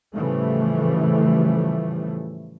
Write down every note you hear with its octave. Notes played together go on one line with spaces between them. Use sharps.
A2 C#3 E3 F3 G3 A3